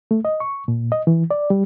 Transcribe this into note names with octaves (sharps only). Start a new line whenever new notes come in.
A3
D#5
C#6
A#2
D#5
E3
D5
G3